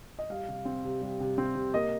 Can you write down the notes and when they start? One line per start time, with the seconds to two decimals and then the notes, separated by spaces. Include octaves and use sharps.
0.19 D#5
0.30 G3 F5
0.48 C3
0.65 C4
0.84 C3
1.01 G3
1.20 C3
1.38 C4
1.55 C3
1.74 A#3 D#5